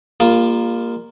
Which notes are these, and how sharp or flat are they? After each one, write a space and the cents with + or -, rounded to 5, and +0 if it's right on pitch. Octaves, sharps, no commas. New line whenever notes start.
G3 +45 A#3 +0 F4 +0